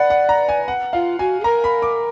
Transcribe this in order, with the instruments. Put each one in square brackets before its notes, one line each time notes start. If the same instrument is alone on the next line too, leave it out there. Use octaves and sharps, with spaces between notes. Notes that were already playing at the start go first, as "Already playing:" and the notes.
Already playing: [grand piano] B4 F#5 [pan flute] D5
[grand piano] F#5
A#5
G#5
F#5
[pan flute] F4 [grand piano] F5
[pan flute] F#4 [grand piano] G#5
[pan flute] G#4
[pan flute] A#4 [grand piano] A#5
[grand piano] B5
D6